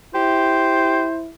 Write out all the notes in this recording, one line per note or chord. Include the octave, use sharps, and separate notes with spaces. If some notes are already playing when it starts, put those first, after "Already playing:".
E4 G4 C5